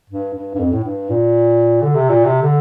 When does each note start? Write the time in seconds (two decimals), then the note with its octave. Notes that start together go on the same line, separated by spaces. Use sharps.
0.10 G2
0.34 G2
0.55 G2
0.59 F2
0.73 A2
0.84 G2
1.10 A#2
1.82 D3
1.95 C3
2.09 A#2
2.25 C3
2.42 D3